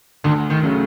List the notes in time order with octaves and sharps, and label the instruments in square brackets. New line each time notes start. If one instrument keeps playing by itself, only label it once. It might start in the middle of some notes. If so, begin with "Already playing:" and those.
[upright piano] D2 [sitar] D3
[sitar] D#3
[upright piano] C#3 F#3 A3 C#4